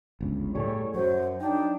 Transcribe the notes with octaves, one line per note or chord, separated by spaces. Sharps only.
G1 C#2
A2 G3 G#4 A4 C#5
F#2 F#3 C5
D4 D#4 G5